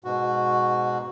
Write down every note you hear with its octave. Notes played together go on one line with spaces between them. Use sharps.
G#2 B2 F#4